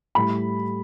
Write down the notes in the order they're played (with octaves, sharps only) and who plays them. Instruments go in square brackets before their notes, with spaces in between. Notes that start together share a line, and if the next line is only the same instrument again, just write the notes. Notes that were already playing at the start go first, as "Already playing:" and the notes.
[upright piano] A2 G3 B5